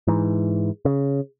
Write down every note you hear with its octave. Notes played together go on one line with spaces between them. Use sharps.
G#2 E3
C#3